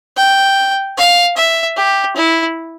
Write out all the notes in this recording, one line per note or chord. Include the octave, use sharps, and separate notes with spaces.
G5
F5
E5
G4
E4